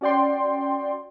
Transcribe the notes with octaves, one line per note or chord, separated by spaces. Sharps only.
C#4 F#4 D5 G5 C6